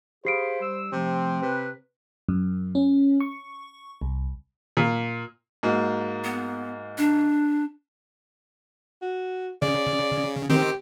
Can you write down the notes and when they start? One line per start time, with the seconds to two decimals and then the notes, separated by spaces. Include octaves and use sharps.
0.25 G4 G#4 C5 F5 B5 C7 D7
0.61 G3 E6
0.93 C3 F3 A3 C4
1.42 C3 B4
2.29 F#2
2.75 C#4
3.21 C#6
4.01 C2
4.77 A#2
5.63 G#2 A#3 F#4
6.24 B3
6.98 D4
9.02 F#4
9.62 C#3 D5
10.50 D#3 C4 G4